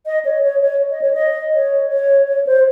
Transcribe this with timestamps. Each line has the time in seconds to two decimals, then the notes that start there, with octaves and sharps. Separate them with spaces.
0.06 D#5
0.25 C#5
0.43 C#5
0.62 C#5
0.91 D#5
1.02 C#5
1.13 D#5
1.54 C#5
1.91 C#5
2.28 C#5
2.47 C5